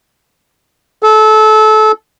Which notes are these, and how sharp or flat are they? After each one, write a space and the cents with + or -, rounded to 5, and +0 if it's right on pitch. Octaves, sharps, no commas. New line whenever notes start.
A4 -25